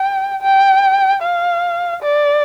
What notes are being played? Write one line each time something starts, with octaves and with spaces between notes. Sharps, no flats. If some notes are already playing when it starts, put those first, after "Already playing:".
Already playing: G5
G5
F5
D5